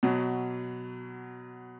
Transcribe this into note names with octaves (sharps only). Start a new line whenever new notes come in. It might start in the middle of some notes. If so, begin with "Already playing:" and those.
B2 F#3